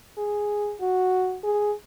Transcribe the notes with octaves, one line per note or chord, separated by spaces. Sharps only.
G#4
F#4
G#4